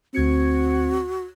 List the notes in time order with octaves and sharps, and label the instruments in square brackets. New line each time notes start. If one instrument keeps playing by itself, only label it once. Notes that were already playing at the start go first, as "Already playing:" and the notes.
[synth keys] D2 G#6 C#7 [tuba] C4 [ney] F#4